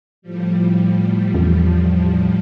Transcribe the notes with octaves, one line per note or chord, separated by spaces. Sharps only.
A2 F3 G3
E2